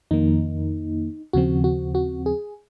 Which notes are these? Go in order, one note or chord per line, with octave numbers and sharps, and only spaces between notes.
F2 D#3 A#3 D#4
D#2 C#3 F3 C4 F#4
F#4
F#4
G#4